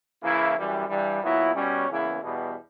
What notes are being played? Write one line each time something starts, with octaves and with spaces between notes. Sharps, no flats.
C#3 E3 A#3 E4
F#2 E3 G3
G2 E3 G3
A#2 F#3 B3 E4
B2 G3 C#4
E2 C#3 E3 A#3 E4
E2 B2 G3 B3